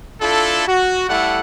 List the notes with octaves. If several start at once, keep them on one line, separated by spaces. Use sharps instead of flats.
D4 E4 F4 A4
F#4
G3 A3 E4 A4 F#5